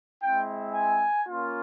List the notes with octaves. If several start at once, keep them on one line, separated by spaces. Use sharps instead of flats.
G#3 C4 E4 G5
G#5
A#3 C#4 F4